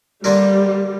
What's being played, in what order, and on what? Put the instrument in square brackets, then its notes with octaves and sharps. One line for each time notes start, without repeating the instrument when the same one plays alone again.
[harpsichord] D3 A#3 D4 F4 A#4 [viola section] G3